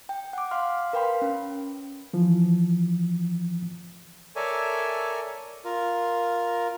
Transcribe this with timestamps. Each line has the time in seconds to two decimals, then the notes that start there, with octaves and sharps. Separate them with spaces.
0.09 G5
0.33 F#5 D6
0.51 F5 C6 F6
0.93 A#4 B4 F5 G5 B5 C6
1.22 C#4
2.13 E3 F3
4.36 A4 A#4 C#5 D5 E5 G#5
5.65 F4 A#4